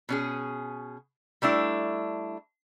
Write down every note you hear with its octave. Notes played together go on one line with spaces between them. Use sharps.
B2 C#4 G#4
G3 A3 D4 E4